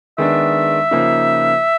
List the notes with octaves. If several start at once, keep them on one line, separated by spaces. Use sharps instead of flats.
D#3 G#3 B3 D4 E5
C#3 F3 A#3 D#4